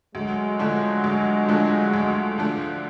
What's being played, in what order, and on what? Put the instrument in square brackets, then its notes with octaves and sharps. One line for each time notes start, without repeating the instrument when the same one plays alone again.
[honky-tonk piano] D2 [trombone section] F#3 G#3
[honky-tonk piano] D3 F3 A3 D4
D2
D3 F3 A3 D4
D2
D3 F3 A3 D4